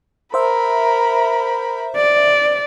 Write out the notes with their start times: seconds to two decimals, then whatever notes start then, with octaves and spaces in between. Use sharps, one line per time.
0.34 A#4 C5 E5 B5
1.97 D5